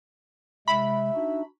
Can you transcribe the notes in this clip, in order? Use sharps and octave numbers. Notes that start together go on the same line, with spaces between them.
C3 G#3 E5 B5
D4 D#4 F#4